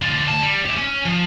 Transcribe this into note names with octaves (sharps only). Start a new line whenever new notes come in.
D3 F4
D2 A5
G3
E4 G4
C#4
F3